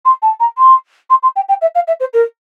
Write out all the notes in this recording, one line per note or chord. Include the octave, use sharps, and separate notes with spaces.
C6
A5
A#5
C6
C6
C6
G5
G5
E5
F5
E5
C5
A#4